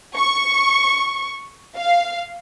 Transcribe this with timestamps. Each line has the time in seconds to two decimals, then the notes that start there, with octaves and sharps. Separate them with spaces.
0.16 C#6
1.77 F5